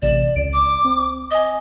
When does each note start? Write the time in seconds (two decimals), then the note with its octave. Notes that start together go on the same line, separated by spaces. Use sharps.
0.02 A1 C3 D5 E7
0.35 C#2 D7
0.53 D6
0.85 C4
1.31 D#5 G#5 D#6